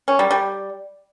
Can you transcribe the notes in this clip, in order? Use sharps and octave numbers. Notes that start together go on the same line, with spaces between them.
C#4
G3
G3